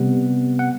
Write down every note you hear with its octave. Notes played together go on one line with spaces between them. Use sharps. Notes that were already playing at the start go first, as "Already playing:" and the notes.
Already playing: C3 G3 B3 F#5
F#5